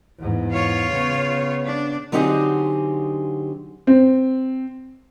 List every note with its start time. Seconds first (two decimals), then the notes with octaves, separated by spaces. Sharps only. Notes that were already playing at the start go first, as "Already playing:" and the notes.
0.18 E2 G#2
0.52 F4 C#5
0.92 C#3 B3
1.65 D4
2.12 D3 F#3 C4 D#4 G4 G#4
3.87 C4